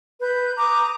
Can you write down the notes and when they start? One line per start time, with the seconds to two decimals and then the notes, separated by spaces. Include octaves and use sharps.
0.21 B4 G6
0.57 A#5 D6 D#6